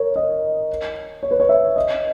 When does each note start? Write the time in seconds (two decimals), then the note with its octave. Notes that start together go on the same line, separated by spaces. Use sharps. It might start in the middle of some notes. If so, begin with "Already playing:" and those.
Already playing: A#4 C#5
0.16 D#5
1.23 C#5
1.31 B4
1.40 C#5
1.49 E5
1.76 D#5